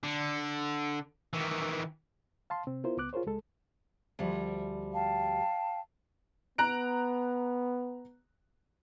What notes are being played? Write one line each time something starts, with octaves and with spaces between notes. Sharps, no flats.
D3
D#3 E3
F5 A5 C6
C3 C4
B3 E4 F4 A#4 C5
C#2 B3 D6 F#6
F4 G#4 A#4 C5 C#5
C#2 G#3 A4
D2 F3 G3
F5 G5 A5
B3 A#5 F#6 D7